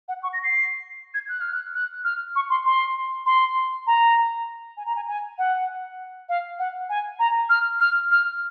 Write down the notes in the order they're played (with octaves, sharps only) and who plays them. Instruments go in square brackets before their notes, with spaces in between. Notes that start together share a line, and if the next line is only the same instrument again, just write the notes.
[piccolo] F#5
C#6
A#6
C7
G#6
F#6
F6
F#6
F#6
F6
C#6
C6
C6
C6
A#5
G#5
A#5
G#5
G#5
F#5
F5
F#5
G#5
A#5
F6
F6
F6